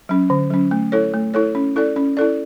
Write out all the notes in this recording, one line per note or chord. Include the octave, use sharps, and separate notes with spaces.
F#3 C#4
D3
F#3 C#4
A3
E4 A4 C#5
A3
E4 A4 C#5
C#4
E4 A4 D5
C#4
E4 A4 D5